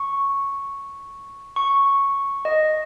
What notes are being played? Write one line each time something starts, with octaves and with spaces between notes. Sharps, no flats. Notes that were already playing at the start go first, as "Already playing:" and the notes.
Already playing: C#6
C#6
D#5